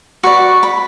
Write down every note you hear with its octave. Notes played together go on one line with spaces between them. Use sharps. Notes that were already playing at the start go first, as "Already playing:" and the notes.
F#4 B4 D5 C#6
B5